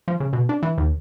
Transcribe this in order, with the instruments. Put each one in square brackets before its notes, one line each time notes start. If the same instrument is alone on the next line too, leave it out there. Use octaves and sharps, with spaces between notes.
[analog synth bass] F3
C#3
B2
D4
E3
D#2